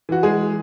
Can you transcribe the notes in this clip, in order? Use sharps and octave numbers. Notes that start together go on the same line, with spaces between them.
E3 F#4
G#3 G#4